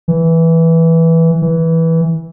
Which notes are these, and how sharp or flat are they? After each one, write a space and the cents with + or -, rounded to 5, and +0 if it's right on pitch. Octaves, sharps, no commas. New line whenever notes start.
E3 -5
E3 -10